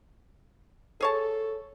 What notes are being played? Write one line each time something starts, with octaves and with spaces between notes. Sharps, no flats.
G#4 A4 C#5 A5